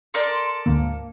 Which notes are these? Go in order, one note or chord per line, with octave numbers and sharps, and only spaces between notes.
A4 A#4 D5 C6
D2 G#2 D3 A#3